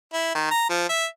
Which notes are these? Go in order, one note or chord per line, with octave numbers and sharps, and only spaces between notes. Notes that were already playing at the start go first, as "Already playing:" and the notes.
E4
D#3
A#5
F3
E5